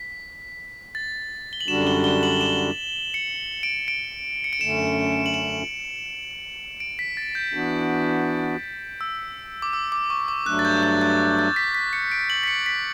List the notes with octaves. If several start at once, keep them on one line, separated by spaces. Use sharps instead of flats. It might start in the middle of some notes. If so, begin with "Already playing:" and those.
Already playing: B6
A6
G7
F#7
F#2 D3 G3 D4 F#4 E7
G7
G7
F#7
E7
C#7
D7
D7
C#7
D7
F#2 D3 A3 C#4 E7
F#7
E7
D7
B6
A6
G6
E3 B3 D4 F#4
E6
D6
E6
D6
C#6
D6
G2 F#3 A3 D4 F#6
A6
G6
A6
A6
A6
B6
B6
C#7
D7
F#7
B6
C#7
B6